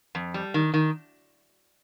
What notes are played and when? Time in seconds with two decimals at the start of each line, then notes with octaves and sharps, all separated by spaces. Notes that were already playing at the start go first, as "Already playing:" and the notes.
0.15 F2
0.34 G3
0.54 D#3
0.74 D#3